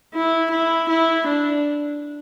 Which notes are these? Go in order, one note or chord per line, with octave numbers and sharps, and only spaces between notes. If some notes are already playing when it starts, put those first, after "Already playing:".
E4
E4
E4
D4